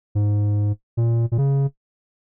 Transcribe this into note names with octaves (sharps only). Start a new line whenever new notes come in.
G#2
A#2
A#2
C#3